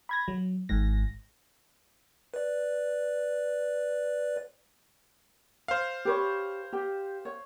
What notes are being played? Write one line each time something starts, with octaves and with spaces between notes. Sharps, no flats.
B5 G#6 A#6
F#3
G#1 G#2 A#6
B4 D5
C5 F5
G4 B4 C#5
G4
C#5